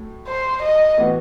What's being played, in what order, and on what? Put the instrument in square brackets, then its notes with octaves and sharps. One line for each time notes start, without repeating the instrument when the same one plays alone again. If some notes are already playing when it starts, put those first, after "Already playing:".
Already playing: [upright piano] A2 F#3 A3
[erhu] C5
D#5
[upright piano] A2 E3 B3 F#4